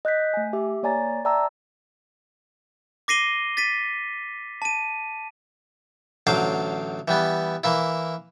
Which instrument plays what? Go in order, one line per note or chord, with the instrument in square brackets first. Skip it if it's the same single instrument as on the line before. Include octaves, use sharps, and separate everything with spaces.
[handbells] D#5 F#6 G6 B6
A3 G#5
G4 E5 D6
A#3 C#5 D5 G#5 A#5 A6
D5 E5 G5 A5 A#5 E6
[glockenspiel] D6 A#6 C7 D#7 G7
A6 B6 D#7
A5 D#7
[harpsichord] A1 D3 F#3 C5 F5 D6
E3 G3 B3
E3 A#3 E4